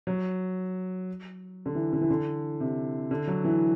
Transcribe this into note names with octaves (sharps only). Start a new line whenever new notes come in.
F#3
D3
E3
D3
E3
D3
C3
D3
F#3
E3